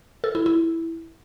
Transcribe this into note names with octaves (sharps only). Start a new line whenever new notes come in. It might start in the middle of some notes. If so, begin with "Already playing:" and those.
A4
E4
E4